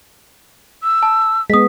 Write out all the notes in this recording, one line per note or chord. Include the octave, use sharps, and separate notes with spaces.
E6
A5
G#3 B3 D#6 B6